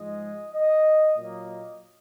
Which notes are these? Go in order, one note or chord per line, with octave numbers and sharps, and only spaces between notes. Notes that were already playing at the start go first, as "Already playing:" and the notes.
Already playing: G#2 F3 G#3 D#5
D#5
A#2 F#3 A#3 D#5